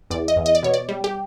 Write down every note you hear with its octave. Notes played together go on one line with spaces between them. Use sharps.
E2 D5
D#5
E2
D#5
D5
B2 C#5
D5
G3
G4